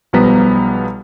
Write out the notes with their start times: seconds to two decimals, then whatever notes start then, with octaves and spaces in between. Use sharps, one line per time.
0.13 B1 F3 G3 B3 A#5 B6